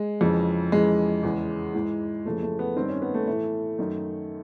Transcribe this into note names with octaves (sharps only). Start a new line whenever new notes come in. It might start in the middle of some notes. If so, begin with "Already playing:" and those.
Already playing: G#3
F2 C#3 E3
F2 C#3 E3 G#3
E2 C#3 E3
G#2 E3
F2 C#3 E3 A3
A3
B3
G2 D#3 C4
C#4
B3
A3
A2 E3 A3
F#2 D#3